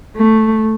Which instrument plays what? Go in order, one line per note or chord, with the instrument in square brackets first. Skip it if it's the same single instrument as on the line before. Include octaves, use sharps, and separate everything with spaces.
[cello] A3